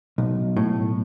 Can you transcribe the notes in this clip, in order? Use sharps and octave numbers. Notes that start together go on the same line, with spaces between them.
B1
A2